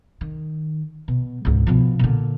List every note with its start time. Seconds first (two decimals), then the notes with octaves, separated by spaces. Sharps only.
0.21 D#3
1.08 B2
1.45 C#2 G#2
1.67 B2 F3
1.99 A#2 D3